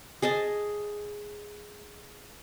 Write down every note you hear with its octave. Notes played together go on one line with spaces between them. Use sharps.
G#4 D#5 G#5 A5